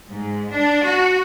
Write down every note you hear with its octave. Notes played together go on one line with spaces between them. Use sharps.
G#2
D4
F#4